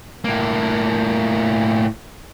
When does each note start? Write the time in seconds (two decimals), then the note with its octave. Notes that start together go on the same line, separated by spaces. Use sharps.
0.24 A2 A#3